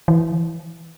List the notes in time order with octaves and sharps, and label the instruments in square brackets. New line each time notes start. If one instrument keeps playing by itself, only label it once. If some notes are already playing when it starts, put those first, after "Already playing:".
[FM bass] E3